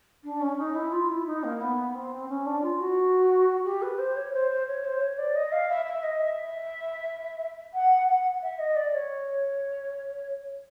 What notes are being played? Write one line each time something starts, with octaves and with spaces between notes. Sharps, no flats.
D4
C#4
D#4
E4
F4
E4
D#4
A#3
B3
C4
C#4
D4
F4
F#4
G4
B4
C5
C#5
C5
C5
C#5
C5
C#5
D5
D#5
F5
E5
E5
D#5
E5
F#5
F#5
E5
D#5
D5
C#5